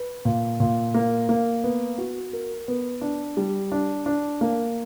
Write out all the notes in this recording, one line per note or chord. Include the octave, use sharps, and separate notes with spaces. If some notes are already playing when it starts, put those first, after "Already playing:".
Already playing: B4
A#2
A#2
A#3
A#3
B3
F#4
A#4
B3
D4
G3
D4
D4
A#3